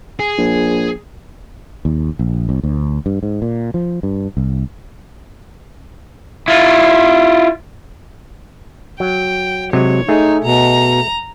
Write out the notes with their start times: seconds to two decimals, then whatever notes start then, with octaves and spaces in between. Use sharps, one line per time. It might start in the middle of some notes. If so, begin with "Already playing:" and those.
0.19 G#4
0.38 A#1
1.85 D#2
2.19 A#1
2.49 C2
2.63 D2
3.06 G2
3.23 G#2
3.42 A#2
3.74 F3
4.03 G2
4.37 C2
6.48 E4 F4
9.00 F#3 G5
9.73 C3 F#3 G#3 C#5
10.09 A3 D#4 G#4
10.44 B2 A#5